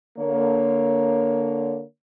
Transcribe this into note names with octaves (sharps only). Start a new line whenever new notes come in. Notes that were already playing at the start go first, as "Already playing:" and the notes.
D3 A#3 C#5